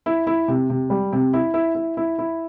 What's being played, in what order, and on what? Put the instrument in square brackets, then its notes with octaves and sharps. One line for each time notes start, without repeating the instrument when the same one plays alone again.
[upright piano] E4
E4
C3
C3
G3
C3
E4
E4
E4
E4
E4